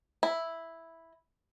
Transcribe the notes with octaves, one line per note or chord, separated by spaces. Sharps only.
E4